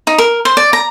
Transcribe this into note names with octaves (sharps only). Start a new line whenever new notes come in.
D#4
A#4
C5
D5
A#5